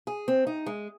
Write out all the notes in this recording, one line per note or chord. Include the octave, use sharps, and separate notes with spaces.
G#4
C4
D#4
G#3